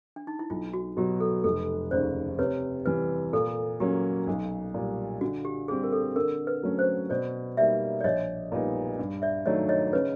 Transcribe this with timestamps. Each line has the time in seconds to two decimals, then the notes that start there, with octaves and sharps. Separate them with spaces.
0.16 D4
0.27 D#4
0.39 E4
0.50 B1 F4
0.73 F#4
0.97 B2 F#3 G4
1.20 A4
1.44 F1 A4
1.91 D#2 C#3 C5 D5
2.39 C3 B4 C#5
2.86 E3 G3 B4
3.33 A#2 A4
3.80 F#3 A#3 C#4 G4
4.27 B1
4.74 A#2 G3
5.21 D3 F#4
5.45 G4
5.68 G3 C4 G#4
5.83 A#4
5.92 A4
6.15 D3 A#4
6.47 B4
6.63 F#3 A3 C#4
6.79 C5
7.10 B2 C5 D5
7.57 G3 A#3 D#4 D5 E5
8.01 D5
8.04 A#1 C#5 D#5
8.52 A#2 G3 B3 D#4
8.99 G2
9.22 D5 E5
9.46 D#3 F#3 A3 D4 C#5 D#5
9.69 C#5 D#5
9.93 C#3 B4 C#5